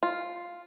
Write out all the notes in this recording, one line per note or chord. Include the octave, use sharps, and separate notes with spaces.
F4